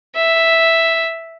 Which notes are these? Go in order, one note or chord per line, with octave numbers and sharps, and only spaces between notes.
E5